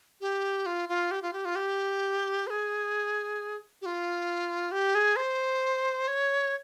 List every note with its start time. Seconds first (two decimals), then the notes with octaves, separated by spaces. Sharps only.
0.21 G4
0.66 F4
0.89 F4
1.11 G4
1.22 F4
1.33 G4
1.45 F4
1.56 G4
2.47 C5
2.50 G#4
3.82 G4
3.86 F4
4.72 G4
4.95 G#4
5.16 C5
6.08 C#5